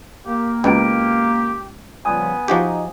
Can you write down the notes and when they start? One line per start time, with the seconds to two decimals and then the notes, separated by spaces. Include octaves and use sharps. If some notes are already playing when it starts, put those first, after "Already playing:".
0.26 A#3 G4
0.64 C#2 B2 G4 G5 D7
2.05 C#3 F3 G3 B3 G#5 D#6
2.48 F3 D#4 F#4 G4